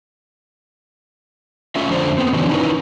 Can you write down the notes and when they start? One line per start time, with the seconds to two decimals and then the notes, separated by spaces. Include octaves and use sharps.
1.76 A3 C#4 F4 E5
1.90 F2 D3 C5 D5
2.18 B3 C4
2.33 D#3 E3 F#3 C#4 D4
2.49 C#4 D#4 E4 G#4 A#4 B4